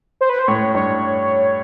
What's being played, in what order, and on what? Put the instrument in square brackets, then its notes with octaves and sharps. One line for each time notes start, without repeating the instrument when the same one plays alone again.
[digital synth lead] C5
B4
C5
[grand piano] A2 [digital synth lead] C#5
[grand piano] G2 [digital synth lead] C#5